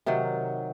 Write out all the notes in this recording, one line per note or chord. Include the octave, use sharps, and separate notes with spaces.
C3 D#3 F#3